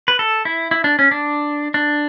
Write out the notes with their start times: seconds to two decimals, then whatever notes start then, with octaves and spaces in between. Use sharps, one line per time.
0.08 B4
0.19 A4
0.45 E4
0.71 E4
0.84 D4
0.99 C#4
1.11 D4
1.74 D4